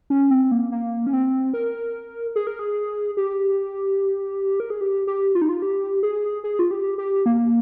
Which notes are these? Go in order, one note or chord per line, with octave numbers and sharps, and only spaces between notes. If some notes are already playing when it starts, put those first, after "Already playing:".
C#4
C4
A#3
A#3
C#4
C4
A#4
G#4
A#4
G#4
G4
A#4
G#4
G4
G4
F4
D#4
F4
G4
G#4
G#4
F4
G4
G4
A#3